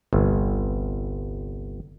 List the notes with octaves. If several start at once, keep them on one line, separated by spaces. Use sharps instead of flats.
G1 C2